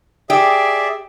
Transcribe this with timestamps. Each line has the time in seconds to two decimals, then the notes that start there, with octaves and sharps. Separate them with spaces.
0.30 G4 G#4 D5 E5